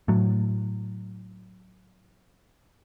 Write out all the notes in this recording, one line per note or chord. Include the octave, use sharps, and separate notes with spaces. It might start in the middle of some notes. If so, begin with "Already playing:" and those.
A2 F#3